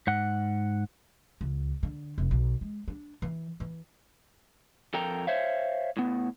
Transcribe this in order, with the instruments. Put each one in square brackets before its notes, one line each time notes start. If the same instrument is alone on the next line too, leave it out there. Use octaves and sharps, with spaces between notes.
[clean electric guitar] G#2 F#5
[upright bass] C#2
D3
F1
B1
G#3
D4
E3
E3
[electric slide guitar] F2 A4 A#4 G5 A#5
C5 C#5 E5 F5
A2 B3